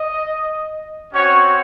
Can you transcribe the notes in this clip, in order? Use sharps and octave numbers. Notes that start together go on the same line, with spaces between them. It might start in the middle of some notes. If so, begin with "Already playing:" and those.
Already playing: D#5
C4 C#4 F#4 C#5